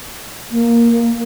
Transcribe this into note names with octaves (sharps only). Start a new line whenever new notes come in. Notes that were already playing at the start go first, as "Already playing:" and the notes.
A#3